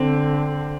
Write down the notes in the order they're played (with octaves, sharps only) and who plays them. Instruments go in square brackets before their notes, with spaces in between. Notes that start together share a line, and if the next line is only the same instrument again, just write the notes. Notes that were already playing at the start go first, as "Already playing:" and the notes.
Already playing: [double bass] D3 [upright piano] C4